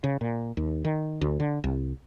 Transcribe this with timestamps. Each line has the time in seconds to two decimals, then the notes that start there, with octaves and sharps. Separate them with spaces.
0.04 C#3
0.21 A#2
0.57 D#2
0.85 D#3
1.21 D2
1.40 D3
1.64 C2